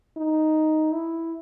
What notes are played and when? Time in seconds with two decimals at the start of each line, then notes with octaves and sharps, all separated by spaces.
0.17 D#4
0.94 E4